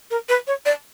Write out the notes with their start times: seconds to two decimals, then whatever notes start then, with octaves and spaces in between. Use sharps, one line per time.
0.11 A#4
0.29 B4
0.47 C#5
0.66 D5